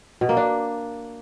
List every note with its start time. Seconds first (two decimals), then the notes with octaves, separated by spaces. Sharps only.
0.21 B2
0.29 A#3
0.37 D4